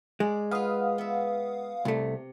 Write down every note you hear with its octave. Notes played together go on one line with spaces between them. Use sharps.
G#3 D5
F4 B4 F5 F#5 D#6
B3 E5
C2 C3 A3